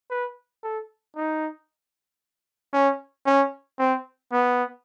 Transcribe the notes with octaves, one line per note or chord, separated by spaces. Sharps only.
B4
A4
D#4
C#4
C#4
C4
B3